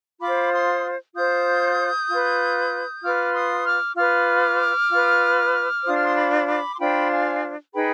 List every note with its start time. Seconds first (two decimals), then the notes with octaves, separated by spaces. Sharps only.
0.21 F4 C5 B5 D6
0.53 C6 D#6
1.15 F4 C5 D#6 G6
2.09 F4 B4
3.03 F4 B4 D6 F6
3.34 C6 D#6
3.65 D6 F6
3.97 F4 B4 D6 F6
4.91 F4 B4
5.84 D4 F4 C5 D#6
5.95 F6
6.03 C6 D#6
6.16 B5 D6
6.47 B5 D6
6.75 C6
6.79 D4 F4 C5 G5 B5
7.10 F5 G#5
7.73 D#4 G#4 B4 G5 B5